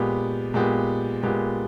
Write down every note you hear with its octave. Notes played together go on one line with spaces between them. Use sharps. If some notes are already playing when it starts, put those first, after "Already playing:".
Already playing: A#2 G#3 B3 G4
A#2 G#3 B3 G4
A#2 G#3 B3 G4